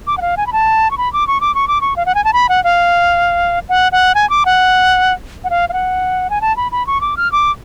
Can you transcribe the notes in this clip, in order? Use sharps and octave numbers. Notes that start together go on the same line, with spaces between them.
D6
F#5
F5
G#5
B5
A5
C#6
B5
D6
C#6
D6
C#6
D6
C#6
F5
F#5
G#5
A5
B5
F#5
F5
F#5
F#5
G#5
D6
F#5
F#5
F5
F5
F#5
G#5
A5
B5
B5
C#6
D6
F6
D6